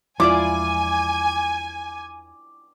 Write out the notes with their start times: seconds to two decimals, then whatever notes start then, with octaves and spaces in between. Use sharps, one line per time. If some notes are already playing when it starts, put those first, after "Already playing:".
0.20 E2 F3 G#3 E4 F4 D5 G#5 D6